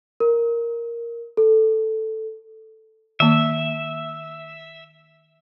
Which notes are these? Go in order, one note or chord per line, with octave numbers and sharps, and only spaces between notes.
A#4
A4
D#3 A#3 E5